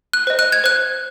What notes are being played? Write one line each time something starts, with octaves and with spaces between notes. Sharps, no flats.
F#6
C5 D#5
F#6
G#6
C5 F#6